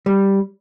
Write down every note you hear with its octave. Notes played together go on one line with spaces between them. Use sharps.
G3